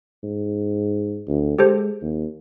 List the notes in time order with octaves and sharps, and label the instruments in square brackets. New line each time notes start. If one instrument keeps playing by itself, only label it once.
[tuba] G#2
D2
[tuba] G#3 [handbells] G4 A4 C5
[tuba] D#2